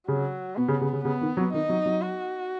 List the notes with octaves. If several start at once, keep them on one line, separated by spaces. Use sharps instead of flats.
C#3 F#3
B2 B3
C#3
C#3
C#3
C#3 B3
D#3
F#3
D#3 D#4
F#3
F#3
F#4